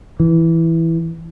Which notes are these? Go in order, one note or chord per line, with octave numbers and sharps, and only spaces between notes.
E3